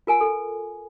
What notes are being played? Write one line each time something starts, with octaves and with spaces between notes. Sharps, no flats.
F4 A#4 G#5
A4